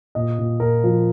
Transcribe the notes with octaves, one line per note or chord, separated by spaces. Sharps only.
A#2 D#5
A#2
A#2 A#4
F3